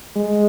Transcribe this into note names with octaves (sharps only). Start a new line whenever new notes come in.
G#3